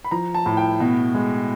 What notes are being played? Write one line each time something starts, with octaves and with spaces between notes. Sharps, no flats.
B5
F3 A#5
A5
A2
G5
B2
G#3